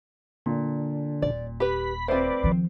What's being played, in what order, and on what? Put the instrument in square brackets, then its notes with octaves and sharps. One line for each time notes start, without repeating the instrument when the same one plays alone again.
[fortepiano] A#2 [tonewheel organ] D3
[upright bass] D#1 [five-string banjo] D5
[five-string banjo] G4 B4 [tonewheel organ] B5
[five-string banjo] A3 F4 [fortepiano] C4 C5 [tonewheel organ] B4 D5
[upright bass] D#3 F3